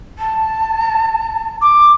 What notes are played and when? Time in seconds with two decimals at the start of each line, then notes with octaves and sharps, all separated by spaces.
0.18 A5
1.61 D6